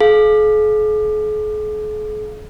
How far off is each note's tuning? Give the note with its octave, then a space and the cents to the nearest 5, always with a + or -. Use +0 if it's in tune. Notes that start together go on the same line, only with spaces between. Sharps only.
G#4 +45 F5 +0